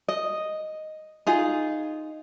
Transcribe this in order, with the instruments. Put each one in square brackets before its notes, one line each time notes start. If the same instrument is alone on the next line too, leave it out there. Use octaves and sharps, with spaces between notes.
[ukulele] D#5
D#4 F4 G#4